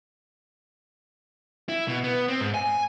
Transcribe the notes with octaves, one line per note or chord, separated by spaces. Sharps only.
E4
B2
B3
C4
G#2
G#5